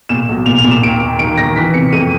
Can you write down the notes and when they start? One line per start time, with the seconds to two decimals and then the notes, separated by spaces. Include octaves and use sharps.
0.09 A#2 E7
0.29 B1
0.46 A#2 F7
0.58 F7
0.64 A#2
0.71 E7
0.82 D#2 D7
1.00 D#2
1.19 D#3 D7
1.37 D#3 A#6
1.56 E3 B6
1.74 C3 C#7
1.92 F2 D#7